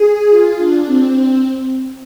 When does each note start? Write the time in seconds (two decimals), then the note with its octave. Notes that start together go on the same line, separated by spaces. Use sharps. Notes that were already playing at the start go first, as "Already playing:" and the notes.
Already playing: G#4
0.30 F4
0.58 D4
0.86 C4